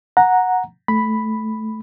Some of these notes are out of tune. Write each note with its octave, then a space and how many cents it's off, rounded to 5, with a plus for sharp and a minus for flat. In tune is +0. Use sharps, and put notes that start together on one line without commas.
F#5 -10 A#5 +0
A3 -10 B5 +0